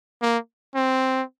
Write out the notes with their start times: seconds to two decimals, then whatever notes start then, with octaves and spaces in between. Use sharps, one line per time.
0.22 A#3
0.75 C4